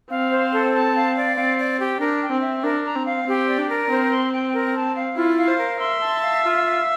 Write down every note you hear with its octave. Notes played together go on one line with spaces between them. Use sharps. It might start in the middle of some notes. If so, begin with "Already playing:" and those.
C4 F5
C5
A4
A5
F5
D5
C4 F5
D5
G4
D4 A#4
G5
C4
E5
D4 A#4
A#5
C4
F5
C4 G4
D5
D4
A#4
C4 C5
C6
G5
A#4
A5
F5
E4 F4
F5
C5
A#4
E5 C6
A5
F5
F4
F5